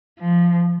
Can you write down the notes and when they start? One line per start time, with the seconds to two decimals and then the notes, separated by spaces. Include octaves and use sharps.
0.20 F3